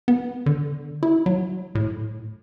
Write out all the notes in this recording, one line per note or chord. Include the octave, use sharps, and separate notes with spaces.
B3
D3
E4
F#3
A2